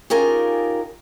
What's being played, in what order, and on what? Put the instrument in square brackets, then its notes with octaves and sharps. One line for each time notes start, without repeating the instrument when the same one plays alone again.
[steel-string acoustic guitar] C#4 D#4 F4 G4 G#4 A#4